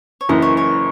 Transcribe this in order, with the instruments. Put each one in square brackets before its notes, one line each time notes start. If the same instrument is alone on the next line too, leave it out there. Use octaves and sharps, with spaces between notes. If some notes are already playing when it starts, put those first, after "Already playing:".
[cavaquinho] C#5
[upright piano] F#1 F#2 E3 [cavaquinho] D#5
[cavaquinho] C#5
C#5